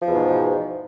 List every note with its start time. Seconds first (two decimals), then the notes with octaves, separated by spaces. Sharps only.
0.01 F3
0.05 E2
0.10 B2
0.14 G#2